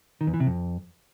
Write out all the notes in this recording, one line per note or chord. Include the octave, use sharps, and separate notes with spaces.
D#3
E2
E3
C3
F2